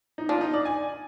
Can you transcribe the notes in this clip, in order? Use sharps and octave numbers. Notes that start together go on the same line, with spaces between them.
D#4
D4 F4
D#4
D5
G#5